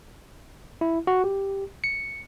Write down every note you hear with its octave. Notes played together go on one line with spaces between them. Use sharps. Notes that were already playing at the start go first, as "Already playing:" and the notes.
E4
F#4
G4
C#7